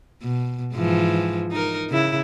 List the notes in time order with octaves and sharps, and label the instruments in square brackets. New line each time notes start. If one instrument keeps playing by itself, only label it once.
[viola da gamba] B2
G#2 E3 F3
D#4 A#4
C#3 E4